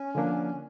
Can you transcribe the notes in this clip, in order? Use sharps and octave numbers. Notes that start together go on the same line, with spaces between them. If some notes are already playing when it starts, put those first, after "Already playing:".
Already playing: C#4
D3 F3 A#3 D4